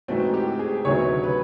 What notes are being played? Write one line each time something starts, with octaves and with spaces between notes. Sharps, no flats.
G#2 E3 A3 C4 F#4
G4
G#4
D2 C3 D#3 F#3 B3 C#5
B4